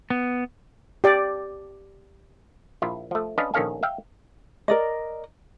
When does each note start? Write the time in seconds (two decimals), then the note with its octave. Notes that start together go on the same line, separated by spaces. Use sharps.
0.10 B3
1.04 G4 D5
2.82 A#1 E4 F4
3.11 F3 A3
3.38 C#4 D4 B4 D#5 F5
3.54 A#1 D#3 C#4 A4 F5 G#5
3.83 E5 F5 G5
4.68 A#4 D5 D#5